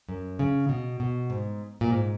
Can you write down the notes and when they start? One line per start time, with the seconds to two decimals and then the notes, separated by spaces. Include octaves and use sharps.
0.09 F#2
0.39 C#3
0.69 B2
1.00 B2
1.30 G#2
1.81 A#2
1.90 G#2